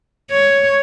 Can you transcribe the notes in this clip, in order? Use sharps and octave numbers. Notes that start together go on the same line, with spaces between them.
C#5